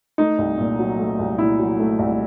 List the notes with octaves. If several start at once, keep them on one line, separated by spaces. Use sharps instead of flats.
A3 D#4
C2
A#2
F#3
A3
C2
A#2 E4
F#3
A3
C2